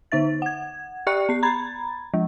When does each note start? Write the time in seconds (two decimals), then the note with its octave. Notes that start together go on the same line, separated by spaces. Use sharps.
0.12 D3 D#4 E5 A6
0.42 F#5 G#6
1.07 G4 D5 G5 C#6 F#6 C#7
1.29 B3 C7
1.43 A#5 B5 G#6 A6
2.14 F3 G#3